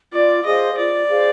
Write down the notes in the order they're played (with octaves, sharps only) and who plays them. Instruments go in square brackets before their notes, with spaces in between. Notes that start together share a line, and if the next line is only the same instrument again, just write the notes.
[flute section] F4 [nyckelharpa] D5
[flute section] G#4 C5 F5 [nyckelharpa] D#5
[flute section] F4 [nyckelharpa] D5
[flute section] G#4 C5 F5